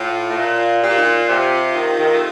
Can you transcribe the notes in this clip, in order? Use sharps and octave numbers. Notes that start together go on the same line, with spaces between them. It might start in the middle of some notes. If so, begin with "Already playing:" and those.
Already playing: A2 F4
A2
A#2
A#2 G4
F4
D#4
F4
C3
C3 D#3
C3 D#3
A3